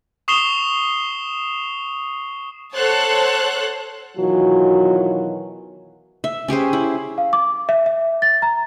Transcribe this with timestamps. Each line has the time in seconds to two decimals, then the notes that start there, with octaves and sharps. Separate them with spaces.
0.28 C#6 D#6 C7 E7 F7 G7
2.74 A4 C5 C#5 F#5 A5 F#6
4.18 B2 D#3 E3 F#3 F4 F#4
6.24 E5
6.48 C#4 G4 G#4 C5
6.73 E4
7.18 F5
7.33 D6
7.69 E5
7.86 E5
8.22 A6
8.42 A#5